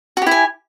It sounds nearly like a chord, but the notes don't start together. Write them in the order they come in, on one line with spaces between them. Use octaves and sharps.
F#4 G4 E4 G#5